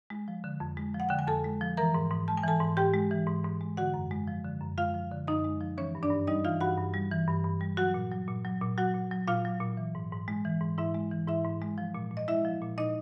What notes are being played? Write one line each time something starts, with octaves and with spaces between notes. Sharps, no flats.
G#3
F3
D3
F2
G#3
F3
F#5
D3 G5
G#5
F2 A4 A5
G#3
F3
E3 A#4 A#5
G#2
G#2
G#3 A5
G#5
E3 A4 A5
G#2
G#2 G4 G5
G#3
E3
G#2
G#2
G#3
D3 F#4 F#5
F#2
G#3
F3
D3
F#2
G#3 F4 F5
F3
D3
F#2 D#4 D#5
G#3
F3
E3 C#4 C#5
G2
D4 D5
G2
G3 D#4 D#5
E3 F4 F5
G2 F#4 F#5
G2
G3
E3
G2
G2
G3
F#3 F#4 F#5
A#2
F#3
A#2
F#3
A#2
F#3 F#4 F#5
A#2
F#3
A#2 F4 F5
F#3
A#2
E3
G#2
G#2
G#3
E3
G#2
G#2 E4 E5
G#3
E3
G#2 E4 E5
G#2
G#3
F3
A#2
A#2
D#5
G#3 E4 E5
F3
A#2
A#2 D#4 D#5